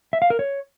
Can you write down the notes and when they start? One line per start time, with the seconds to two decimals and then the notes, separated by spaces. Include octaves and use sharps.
0.13 E5
0.22 F5
0.30 A#4
0.39 C#5